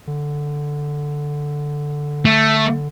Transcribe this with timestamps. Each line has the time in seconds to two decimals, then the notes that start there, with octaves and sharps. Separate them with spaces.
0.07 D3
2.25 A3